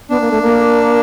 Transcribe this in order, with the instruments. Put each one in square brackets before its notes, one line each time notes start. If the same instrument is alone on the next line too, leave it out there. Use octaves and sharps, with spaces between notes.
[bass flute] B3 [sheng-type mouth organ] D4
[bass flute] A#3
A3
A#3